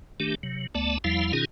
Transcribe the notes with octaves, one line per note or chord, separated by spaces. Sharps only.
D#3 A3 D4 G4
C3 F#3
D2 A3 B3 D5 A5
E2 F3 G3 E4 F5
B2 D#3 C#4 D#4 F4 G#4